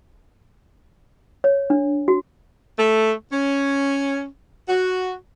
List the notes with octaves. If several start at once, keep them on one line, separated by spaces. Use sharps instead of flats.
C#5
D4
F#4
A3
C#4
F#4